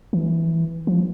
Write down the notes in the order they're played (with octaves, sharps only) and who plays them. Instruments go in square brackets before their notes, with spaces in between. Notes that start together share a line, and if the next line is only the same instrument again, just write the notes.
[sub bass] E3
F3